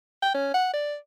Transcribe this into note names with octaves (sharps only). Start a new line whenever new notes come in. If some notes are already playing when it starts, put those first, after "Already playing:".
G5
C#4
F#5
D5